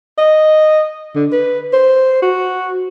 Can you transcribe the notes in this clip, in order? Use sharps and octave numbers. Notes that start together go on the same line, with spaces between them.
D#5
D3
B4
C5
F#4